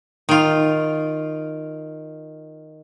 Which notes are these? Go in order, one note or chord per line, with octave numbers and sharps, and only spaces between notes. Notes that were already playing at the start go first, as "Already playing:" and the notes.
D#3 F4